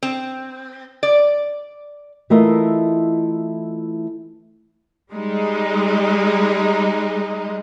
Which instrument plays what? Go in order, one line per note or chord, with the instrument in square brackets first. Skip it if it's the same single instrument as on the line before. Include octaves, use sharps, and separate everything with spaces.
[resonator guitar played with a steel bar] C4
D5
[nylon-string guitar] E3 A3 E4 F4 A#4 D#5
[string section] G3 G#3 D#4